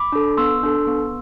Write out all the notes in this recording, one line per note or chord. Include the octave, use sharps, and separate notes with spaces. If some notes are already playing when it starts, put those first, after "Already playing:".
Already playing: B5 D6
D4 A4
B3 C6 E6
D4 A4
B3